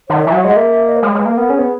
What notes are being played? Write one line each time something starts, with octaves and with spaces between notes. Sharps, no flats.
D#3 C#5
E3 E5
F#3
G#3 F#5
D#5
A#3 E5
E5
D#5
B4
G#3 C#5
G#3 B4
A#3
B3 A#4
C#4 G#4
B3